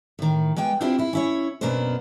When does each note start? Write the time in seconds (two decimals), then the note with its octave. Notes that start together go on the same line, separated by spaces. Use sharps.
0.19 A2 D#3
0.57 G#3 A#3 B3 G5 G#5
0.81 C4 D4 E4 F4 G4 C5
0.99 E4 F4
1.13 C#4 E4 C#5
1.61 F#2 B2 A#3 B3 D4 C5